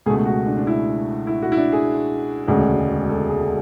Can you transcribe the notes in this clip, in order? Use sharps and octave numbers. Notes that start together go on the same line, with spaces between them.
C#2 B2 A3 G#4
F#4
D4
D4
E4
E4
F#4
E4
D4
G#4
E1 D2 C#3 G#3
A4
G#4